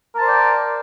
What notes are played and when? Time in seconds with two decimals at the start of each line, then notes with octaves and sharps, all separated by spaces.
0.14 A#4
0.18 A5
0.21 C5
0.25 D5
0.28 G5